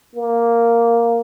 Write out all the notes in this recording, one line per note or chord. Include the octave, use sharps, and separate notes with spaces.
A#3